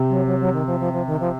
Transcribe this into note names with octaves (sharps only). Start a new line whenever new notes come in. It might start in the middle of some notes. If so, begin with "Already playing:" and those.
Already playing: C3
F#3
F#3
F#3
D#3
F3
F3
F3
D#3
F3